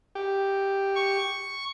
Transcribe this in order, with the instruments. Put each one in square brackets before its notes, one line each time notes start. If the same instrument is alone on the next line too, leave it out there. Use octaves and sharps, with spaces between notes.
[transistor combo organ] G4
[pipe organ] C#6